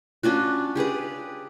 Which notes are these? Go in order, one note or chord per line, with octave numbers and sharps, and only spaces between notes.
C#4 D4 F4 F#4
G4 G#4 B4 D5